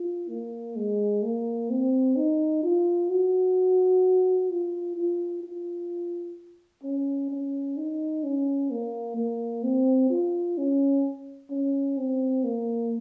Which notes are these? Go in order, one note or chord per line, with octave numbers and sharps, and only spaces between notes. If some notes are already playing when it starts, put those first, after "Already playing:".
Already playing: F4
A#3
G#3
A#3
C4
D#4
F4
F#4
F4
F4
F4
C#4
C#4
D#4
C#4
A#3
A#3
C4
F4
C#4
C#4
C4
A#3